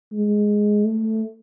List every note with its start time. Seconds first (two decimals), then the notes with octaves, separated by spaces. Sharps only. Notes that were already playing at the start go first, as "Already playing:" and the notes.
0.13 G#3
0.85 A3